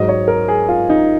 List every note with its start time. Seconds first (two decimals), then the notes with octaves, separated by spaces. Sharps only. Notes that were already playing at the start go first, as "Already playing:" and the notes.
Already playing: G#2 F#3 D#5
0.09 C#5
0.28 A#4
0.48 G#4
0.69 F4
0.89 D#4